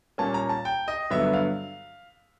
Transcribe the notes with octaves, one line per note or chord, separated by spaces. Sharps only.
A#2 G3 A#3 C#4 A5
A#5
A5
G5
D#5
G2 D3 F#3 B3 E5
F5